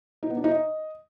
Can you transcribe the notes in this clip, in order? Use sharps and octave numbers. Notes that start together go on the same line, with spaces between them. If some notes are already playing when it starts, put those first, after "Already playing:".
D#4
B3
D4
D#4
D#5